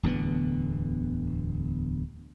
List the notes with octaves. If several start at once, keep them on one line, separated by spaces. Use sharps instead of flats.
D1 E2 D3 B3